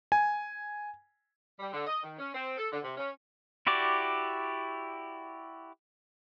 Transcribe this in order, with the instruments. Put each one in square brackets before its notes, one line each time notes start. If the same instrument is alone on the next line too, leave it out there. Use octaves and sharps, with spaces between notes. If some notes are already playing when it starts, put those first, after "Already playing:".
[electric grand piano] G#5
[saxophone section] G3
D3
D#5
D#3
C#4
C4
A4
D3
C3
C#4
[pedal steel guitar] E4 F#4 G4 D5